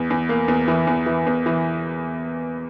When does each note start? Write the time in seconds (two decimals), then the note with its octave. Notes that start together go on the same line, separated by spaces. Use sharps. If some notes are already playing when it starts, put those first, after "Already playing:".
Already playing: E2
0.10 E2
0.29 A#3
0.48 E2
0.68 E3
0.87 E2
1.06 E3
1.26 E2
1.46 E3